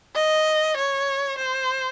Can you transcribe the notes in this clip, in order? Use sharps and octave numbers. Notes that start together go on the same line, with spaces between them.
D#5
C#5
C5